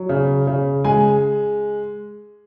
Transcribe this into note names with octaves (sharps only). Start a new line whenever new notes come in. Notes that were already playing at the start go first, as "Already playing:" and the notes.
Already playing: F#3
C#3
C#3
G#3 G#5